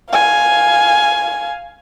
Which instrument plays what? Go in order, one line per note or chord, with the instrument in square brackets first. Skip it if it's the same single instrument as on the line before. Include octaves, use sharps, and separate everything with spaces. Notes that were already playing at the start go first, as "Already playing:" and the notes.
[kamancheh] F5 G#5